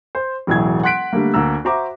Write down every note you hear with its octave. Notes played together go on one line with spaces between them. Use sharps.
C5
E1 A1 F#3 E4 G#4 G#6
F#5 C6 F#6 B6 D7
D3 G3 A3 A#3
D2 A#3 A#5 E6
F#4 C5 E5 A#5 D6